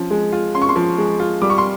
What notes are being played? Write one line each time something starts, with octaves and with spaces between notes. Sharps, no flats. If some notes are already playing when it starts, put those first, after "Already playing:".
Already playing: F3 C#4
G#3
F4
C#4 C6
C#6
C6
F3
G#3
F4
G3 D6
C#6
C6